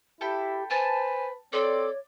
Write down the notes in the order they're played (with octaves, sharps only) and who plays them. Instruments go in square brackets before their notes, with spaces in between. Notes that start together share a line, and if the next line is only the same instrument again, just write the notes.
[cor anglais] E4 [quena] G4 [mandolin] A4 G5 B5
[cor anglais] B4 [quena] C5 [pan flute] G#5 [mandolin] A5
[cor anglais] C4 [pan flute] A4 [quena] C#5 [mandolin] D5